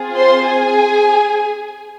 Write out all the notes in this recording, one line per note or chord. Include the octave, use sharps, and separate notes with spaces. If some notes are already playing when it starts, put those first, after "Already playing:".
Already playing: C4 F4 G#4
C5 C6
G#4 G#5